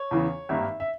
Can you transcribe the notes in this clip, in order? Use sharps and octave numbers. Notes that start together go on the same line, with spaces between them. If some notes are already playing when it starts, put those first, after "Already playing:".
Already playing: C#5
E2 C#3 E3
G#1 G2 D#3 A#3 E5
E5